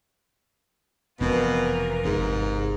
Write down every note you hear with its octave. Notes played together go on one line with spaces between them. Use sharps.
F1 B2 E3 C4 F4 A#4
G1 G#2 C3